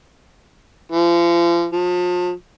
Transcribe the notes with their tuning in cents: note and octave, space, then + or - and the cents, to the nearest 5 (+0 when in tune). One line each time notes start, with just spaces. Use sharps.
F3 -35
F3 +35